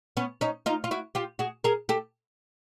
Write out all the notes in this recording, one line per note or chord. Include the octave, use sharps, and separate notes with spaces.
B3 C#4
C#4 D#4
D#4 F4
F4
E4 F#4
F4 G4
F#4 G#4
G#4 A#4
G4 A4